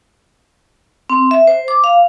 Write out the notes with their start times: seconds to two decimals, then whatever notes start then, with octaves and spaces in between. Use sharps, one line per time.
1.10 C4
1.31 E5
1.47 C5
1.68 D6
1.84 F5